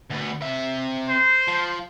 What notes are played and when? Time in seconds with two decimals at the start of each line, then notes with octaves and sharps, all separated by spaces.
0.10 D2 B3
0.42 C3 E5
1.09 C5
1.48 F3